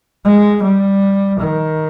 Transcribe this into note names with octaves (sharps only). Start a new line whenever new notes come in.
G#3
G3
D#3